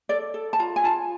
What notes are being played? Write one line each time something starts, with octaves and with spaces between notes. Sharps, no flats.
A4 D5
A4
A5
F4 A#5
G#5
F4 A5